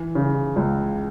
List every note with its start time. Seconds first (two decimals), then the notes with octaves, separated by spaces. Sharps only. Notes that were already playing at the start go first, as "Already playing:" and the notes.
Already playing: E3
0.15 C#3
0.56 C#2